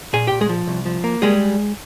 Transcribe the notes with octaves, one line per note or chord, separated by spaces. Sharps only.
A#2 G#4 G#5
A#2 G4 G5
G#3 G#4
F3
C2
F3
A#3
G3 G#3 G#4